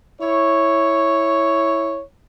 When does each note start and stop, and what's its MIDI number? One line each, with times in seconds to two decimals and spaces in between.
0.21 2.03 64
0.21 2.03 73